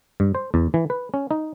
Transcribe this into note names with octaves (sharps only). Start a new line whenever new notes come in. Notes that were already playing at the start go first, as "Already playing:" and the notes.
G2
C5
E2
E3
B4
C#4
D#4